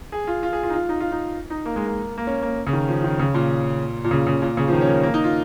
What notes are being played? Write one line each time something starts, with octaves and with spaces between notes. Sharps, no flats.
G#4
F4
F4
G#4
F4
D#4
F4
D#4
F4
D#4
D#4
A#3
G#3
A#3
A#3
C#4
A#3
C#3
D#3
F3
D#3
C#3
A#2
A#2
C#3
C#3
A#2
C#3
F3
D#3
C#4
A#3
A#3
D#4
F4